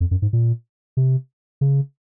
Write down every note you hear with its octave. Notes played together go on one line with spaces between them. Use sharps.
F2
F#2
G#2
A#2
C3
C#3